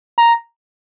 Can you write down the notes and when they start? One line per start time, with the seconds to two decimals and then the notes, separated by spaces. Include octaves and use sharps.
0.18 A#5